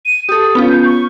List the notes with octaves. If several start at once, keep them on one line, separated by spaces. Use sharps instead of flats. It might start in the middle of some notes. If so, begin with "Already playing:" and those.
D#7
G4 A4 D#6
B3 C#4 F4
G6
C#6